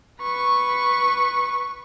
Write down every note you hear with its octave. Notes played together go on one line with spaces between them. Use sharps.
B4 C#6